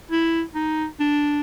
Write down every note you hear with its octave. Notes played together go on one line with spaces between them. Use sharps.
E4
D#4
D4